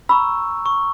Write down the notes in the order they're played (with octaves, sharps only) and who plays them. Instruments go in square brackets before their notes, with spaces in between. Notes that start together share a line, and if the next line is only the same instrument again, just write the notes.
[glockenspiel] A#5 C#6 E6 [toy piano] B5
[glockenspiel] C#6